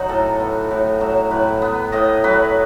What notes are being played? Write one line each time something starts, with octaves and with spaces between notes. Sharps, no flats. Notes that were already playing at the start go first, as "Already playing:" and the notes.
Already playing: F#3 D#4 F#4
A2 A4
B3
A2
F#3
A2 B4
B3
A2 D#5
F#3 B4